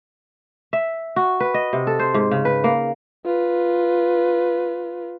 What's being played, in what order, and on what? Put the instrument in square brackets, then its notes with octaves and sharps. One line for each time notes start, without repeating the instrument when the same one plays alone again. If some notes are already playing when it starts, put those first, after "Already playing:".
[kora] E5
F#4
B4
D#5
C3
A4
C5
G#2
C#3
B4
A#3
[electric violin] F4 B4